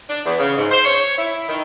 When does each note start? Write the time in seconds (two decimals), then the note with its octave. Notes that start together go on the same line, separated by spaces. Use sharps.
0.09 D4
0.26 E2
0.39 C#3
0.57 G#2
0.71 C5
0.85 C#5
1.18 E4
1.49 D#3